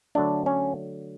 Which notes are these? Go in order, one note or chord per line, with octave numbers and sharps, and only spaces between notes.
D3 F#3 A3 D4
C#4